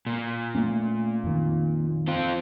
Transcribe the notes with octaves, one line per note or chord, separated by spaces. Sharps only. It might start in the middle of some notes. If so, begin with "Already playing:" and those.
A#2
A3 A#3 C#4
F2 D#3
C4 F4